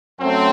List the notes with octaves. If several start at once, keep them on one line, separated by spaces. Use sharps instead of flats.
F#2 F#3 A3 C4